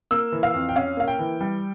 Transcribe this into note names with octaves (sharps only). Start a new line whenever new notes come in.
A#3 E6
E3
F5
F2
G5
C#4 F5
A#3 F5
G5
E3
G3